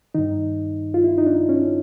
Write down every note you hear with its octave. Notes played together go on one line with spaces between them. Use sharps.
G2 D#3 D#4
F4
E4
D#4
D4
C#4